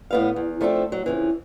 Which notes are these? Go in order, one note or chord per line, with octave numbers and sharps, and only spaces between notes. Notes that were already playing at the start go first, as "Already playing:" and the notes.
A2 B3 F5
E2
F3 A3 C4 D4 A4
F#3
F2 C#3 E3